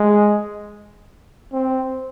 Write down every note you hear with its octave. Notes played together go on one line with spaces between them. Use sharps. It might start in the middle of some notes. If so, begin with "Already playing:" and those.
Already playing: G#3
C4